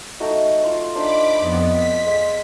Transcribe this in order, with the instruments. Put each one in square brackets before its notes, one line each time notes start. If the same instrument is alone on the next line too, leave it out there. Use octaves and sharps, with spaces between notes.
[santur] A3 D#4 F#4
F4 C6 D6
[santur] D4 D#4 C5 [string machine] B5 D6
[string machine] F2 B3 [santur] D5 D#5
[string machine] B6
[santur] G#3 F5 G#5